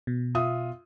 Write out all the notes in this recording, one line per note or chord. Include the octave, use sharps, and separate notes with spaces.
B2
F4 E5 D#6